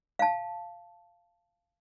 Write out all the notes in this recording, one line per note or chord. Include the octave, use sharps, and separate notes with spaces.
F5 A5